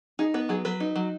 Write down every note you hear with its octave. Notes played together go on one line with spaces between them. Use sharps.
D#4 G#4
B3 B4
F#3 G#4
F#3 B4
D#4
F#3